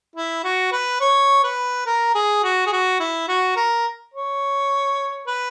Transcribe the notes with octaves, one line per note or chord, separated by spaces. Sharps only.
E4
F#4
B4
C#5
B4
A#4
G#4
F#4
G#4
F#4
E4
F#4
A#4
C#5
B4